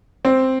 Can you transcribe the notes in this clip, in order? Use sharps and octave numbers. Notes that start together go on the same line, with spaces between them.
C4